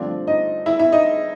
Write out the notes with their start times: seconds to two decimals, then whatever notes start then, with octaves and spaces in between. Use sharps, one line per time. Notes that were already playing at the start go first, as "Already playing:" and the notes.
Already playing: G2 D3 F3 A3 C4 D4 D5
0.27 D#4 D#5
0.66 E4 E5
0.79 E4 E5
0.92 D#4 D#5